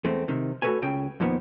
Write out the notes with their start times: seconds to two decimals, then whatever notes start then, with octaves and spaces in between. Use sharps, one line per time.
0.04 E2 G#3 A3 C4
0.28 C3 D#3
0.62 A3 F#4 A4 B4 C#5 G#5
0.82 C#2 C#3 G5
1.20 F2 A#2 D#3 B3